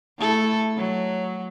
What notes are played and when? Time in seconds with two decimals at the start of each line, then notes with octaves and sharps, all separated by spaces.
0.18 A3 E4 A4
0.77 F#3